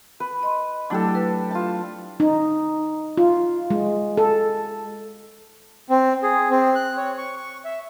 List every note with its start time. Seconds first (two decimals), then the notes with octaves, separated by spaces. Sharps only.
0.20 B4
0.43 D#5 C6
0.90 F#3 A3 D4 E4 G4 A4
1.15 B4
1.51 F4 A5
2.20 D#4
3.17 F4
3.70 G#3
4.17 A4
5.90 C4
6.23 G#4
6.50 C4
6.75 F#6
6.97 C#5
7.18 C#6
7.36 C#6
7.65 E5